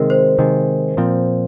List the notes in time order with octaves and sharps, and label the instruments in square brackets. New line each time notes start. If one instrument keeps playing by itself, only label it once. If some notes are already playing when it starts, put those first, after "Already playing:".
Already playing: [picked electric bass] C3 D#3 G#3 [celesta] A#4
[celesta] C5
[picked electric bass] C3 D#3 G#3
A#2 F3 C4